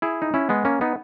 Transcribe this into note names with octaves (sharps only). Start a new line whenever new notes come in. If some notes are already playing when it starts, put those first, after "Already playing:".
E4 G#4
D#4
C#4 E4
G#3 B3
A#3 C#4
B3 D#4